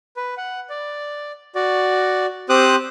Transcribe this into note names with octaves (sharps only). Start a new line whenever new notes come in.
B4
F#5
D5
F#4 D5
C4 G4 C5 D6 D#6 F#6